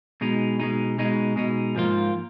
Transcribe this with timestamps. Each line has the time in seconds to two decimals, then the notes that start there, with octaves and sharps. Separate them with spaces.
0.21 B2 G#3 D#4
0.60 B2 G#3 D#4
0.98 B2 G#3 D#4
1.36 B2 G#3 D#4
1.75 G#2 F3 A#3 F4